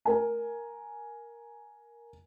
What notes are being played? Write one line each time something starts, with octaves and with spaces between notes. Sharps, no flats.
A#4 G#5